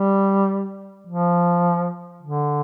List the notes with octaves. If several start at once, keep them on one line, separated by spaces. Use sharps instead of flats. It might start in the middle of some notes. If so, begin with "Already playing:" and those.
Already playing: G3
F3
D3